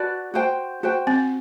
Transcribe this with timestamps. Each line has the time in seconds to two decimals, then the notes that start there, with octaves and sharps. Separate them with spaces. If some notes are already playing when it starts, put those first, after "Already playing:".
Already playing: F#4 B4 D5 A5
0.34 F#4 C5 G5
0.83 F#4 C5 G5
1.07 C4